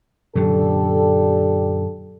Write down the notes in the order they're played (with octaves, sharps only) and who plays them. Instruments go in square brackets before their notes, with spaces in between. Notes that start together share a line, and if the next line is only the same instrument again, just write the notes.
[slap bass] F#2 A#2 D3 [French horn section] D4 G4 A4